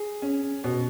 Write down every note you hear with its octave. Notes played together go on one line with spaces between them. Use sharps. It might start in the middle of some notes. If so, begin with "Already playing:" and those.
Already playing: G#4
C#4
B2